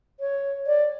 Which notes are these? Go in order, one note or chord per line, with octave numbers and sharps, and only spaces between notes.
C#5
D5